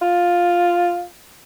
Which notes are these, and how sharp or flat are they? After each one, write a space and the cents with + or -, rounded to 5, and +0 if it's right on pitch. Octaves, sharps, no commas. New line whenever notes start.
F4 +5